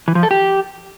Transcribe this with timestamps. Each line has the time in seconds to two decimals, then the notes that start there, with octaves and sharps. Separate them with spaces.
0.08 E3
0.15 F3
0.23 A4
0.31 G4